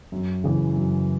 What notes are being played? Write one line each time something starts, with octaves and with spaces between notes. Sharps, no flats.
F#2
C#3 E3
F#2